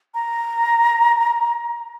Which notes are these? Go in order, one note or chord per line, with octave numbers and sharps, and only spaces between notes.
A#5